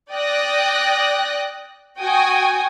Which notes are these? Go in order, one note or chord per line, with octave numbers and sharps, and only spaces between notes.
D5 G5 D#6 F#6 A#6
F#4 G5 G#5 D#6